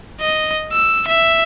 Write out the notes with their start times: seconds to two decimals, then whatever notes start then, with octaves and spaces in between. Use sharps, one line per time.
0.20 D#5
0.72 E6
1.07 E5